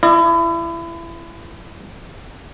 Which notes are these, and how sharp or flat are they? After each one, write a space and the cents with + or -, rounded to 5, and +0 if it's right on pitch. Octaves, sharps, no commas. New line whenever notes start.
E4 +30 D#5 -45